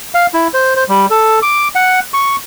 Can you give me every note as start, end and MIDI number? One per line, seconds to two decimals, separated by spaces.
0.14 0.27 77
0.34 0.48 64
0.54 0.74 72
0.76 0.84 72
0.89 1.06 55
1.10 1.39 69
1.42 1.68 86
1.75 2.00 78
2.14 2.36 85